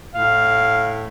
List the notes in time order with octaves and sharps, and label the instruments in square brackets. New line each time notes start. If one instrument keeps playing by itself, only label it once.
[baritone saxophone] A2 [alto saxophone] F5